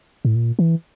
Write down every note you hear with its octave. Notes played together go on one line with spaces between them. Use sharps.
A2
A#2
E3